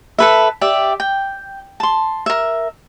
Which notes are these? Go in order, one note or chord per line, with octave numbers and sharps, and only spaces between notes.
A4 B4 E5
G4 D5 E5
G5
A5 C6
A#4 E5